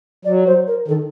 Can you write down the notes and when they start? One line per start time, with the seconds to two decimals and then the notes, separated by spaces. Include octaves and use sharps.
0.25 F#3 D5
0.46 C5
0.67 A#4
0.88 D#3 A4